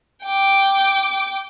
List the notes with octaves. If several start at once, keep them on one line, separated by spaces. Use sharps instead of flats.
G5 D6